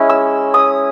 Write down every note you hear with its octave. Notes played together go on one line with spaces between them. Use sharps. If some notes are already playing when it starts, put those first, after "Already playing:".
Already playing: G#3 C#4 E4
E6
D#6